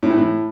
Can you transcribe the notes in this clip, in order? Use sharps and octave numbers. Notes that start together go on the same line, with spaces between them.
A2
E3
A2